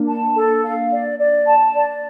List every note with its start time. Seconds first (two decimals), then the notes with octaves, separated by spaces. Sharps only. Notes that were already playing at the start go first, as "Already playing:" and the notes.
Already playing: A#3 D4
0.09 A5
0.37 A4
0.64 F5
0.91 D5
1.18 D5
1.46 A5
1.74 D5